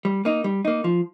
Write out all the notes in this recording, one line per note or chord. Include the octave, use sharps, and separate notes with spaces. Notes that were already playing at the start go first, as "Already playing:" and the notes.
G3
A#3 D#4
G3
A#3 D#4
F3